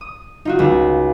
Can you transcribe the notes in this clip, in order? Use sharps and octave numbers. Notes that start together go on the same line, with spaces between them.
D#6
D#4 F4 F#4
C#2